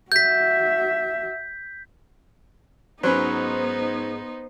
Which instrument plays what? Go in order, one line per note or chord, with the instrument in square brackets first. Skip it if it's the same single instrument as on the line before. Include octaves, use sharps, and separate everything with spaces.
[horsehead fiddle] F#4 E5 [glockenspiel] G6 B6
[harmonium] G#2 [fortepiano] F#3 C#4 B4 [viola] B3 D#4 [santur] C5